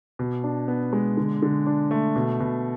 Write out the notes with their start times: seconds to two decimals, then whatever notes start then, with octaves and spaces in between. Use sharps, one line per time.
0.19 B2
0.44 D4
0.68 B3
0.93 G#3
1.17 D3
1.42 D3
1.66 D4
1.91 A3
2.16 B2
2.40 B2